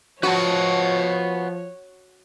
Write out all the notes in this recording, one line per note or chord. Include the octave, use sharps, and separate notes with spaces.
F3 F#4 B4 C#5 F#5 A5